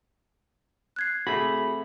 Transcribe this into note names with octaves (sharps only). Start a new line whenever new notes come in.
F#6 G#6 C7
C3 A3 F#4 G#4 B5